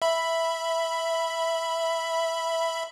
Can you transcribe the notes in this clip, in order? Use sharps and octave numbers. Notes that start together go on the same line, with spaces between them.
E5 B5